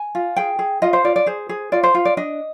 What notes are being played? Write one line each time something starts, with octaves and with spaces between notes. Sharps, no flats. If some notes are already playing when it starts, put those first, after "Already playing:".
Already playing: G#5
F4
G#4 G5
G#4
F4 D#5
C5
F4 D5
D5
G#4 C5
G#4
F4 D5
C5
F4
D5
D4 D#5